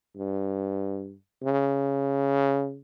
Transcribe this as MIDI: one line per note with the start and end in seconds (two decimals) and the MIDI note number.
0.16 1.14 43
1.43 2.81 49